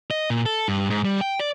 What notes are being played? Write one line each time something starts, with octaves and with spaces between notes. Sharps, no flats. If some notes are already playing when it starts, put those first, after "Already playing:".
D#5
A#2
A4
G2
G#2
G3
G5
D5